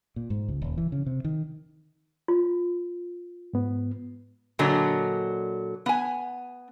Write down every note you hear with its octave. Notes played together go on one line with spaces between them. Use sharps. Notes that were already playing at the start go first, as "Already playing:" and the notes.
A#2
G#2
C#2
D#1
E3
C#3
C3
D#3
F4
G#2 B3
A#2 D3 F#3 D#5
B3 G#5